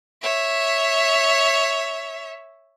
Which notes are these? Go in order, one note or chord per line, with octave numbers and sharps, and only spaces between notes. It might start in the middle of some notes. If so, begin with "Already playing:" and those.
C#5 E5